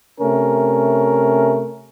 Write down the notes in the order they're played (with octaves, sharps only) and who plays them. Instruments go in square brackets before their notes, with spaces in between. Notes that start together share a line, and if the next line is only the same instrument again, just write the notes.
[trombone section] C3 A3 C#4 A#4